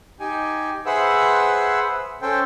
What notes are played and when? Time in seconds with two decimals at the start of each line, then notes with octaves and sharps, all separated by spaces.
0.20 D#4 G4 G#5
0.86 G#4 B4 C5 E5 F#5 E6
2.22 C#4 A4 C5 G5